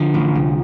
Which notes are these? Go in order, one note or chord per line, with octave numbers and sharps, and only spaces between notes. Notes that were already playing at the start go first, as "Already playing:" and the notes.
Already playing: D3 F3
A1
C2